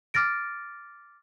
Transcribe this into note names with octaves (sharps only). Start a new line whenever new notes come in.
D6 F6 A6 A#6 D7